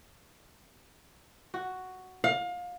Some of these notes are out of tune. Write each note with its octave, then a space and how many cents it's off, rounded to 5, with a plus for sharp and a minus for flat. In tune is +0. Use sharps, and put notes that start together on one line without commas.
F#4 +5
F5 +30